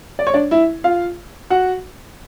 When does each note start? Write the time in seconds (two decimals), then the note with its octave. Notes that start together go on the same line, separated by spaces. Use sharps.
0.19 D5
0.27 C#5
0.34 D4 D5
0.51 E4 E5
0.84 F4 F5
1.50 F#4 F#5